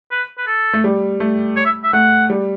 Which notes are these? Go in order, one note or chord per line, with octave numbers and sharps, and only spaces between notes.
B4
B4
A4
A3
G3
A3
C#5
E5
E5
A3 F#5
G3